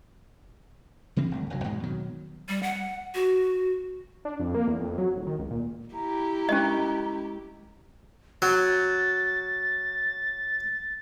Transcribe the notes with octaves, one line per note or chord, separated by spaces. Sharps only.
C#3 E3 G3 C4
G#1 D2
F#1 C2 F#3
E2 G#2 B2 G#3
B2 D#3 F#3
G3
F#5
F#4
D4
F2
A#3
E2
F2
F#3
D#1
D#3
C#2
A#2
E4 G4 A#5
G#3 C#4 A#4 D#5 C#6
F#3 A6